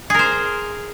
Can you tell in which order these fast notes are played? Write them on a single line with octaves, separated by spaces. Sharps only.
G#4 A#4 C5